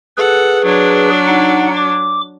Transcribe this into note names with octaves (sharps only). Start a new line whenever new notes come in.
G#4 A4 B4 F#5
F#3 D4
D#4 F#5
D6